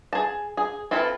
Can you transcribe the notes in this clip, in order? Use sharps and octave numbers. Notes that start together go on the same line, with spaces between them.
G#4 A5
G#4
C4 E4 F4 A4 B4